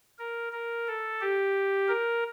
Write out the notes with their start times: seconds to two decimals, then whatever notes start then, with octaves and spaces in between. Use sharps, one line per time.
0.19 A#4
0.53 A#4
0.87 A4
1.21 G4
1.88 A#4